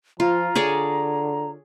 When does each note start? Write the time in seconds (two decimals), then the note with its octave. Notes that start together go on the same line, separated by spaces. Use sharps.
0.20 F3 F4 A#5
0.55 D3 G#4 C#5 D5